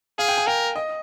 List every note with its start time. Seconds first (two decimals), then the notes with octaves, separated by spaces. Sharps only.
0.19 G#4 F5
0.28 G5
0.38 G#5
0.47 A#4 G5
0.76 D#5